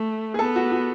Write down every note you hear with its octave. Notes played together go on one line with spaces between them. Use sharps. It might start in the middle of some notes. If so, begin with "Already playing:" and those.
Already playing: A3
G#4
B3 A4
F#4
F#4